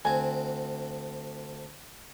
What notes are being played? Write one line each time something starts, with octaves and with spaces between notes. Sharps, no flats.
D2 C4 G#5